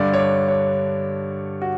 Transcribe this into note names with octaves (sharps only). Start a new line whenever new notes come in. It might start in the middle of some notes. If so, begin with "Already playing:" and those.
Already playing: G2 D3 D5
C#5
D5
C#5
F#4